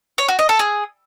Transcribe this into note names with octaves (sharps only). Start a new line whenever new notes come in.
C#5
F#4
D#5
A4
G#4